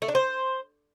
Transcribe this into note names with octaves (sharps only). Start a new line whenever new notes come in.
A3
D4
C5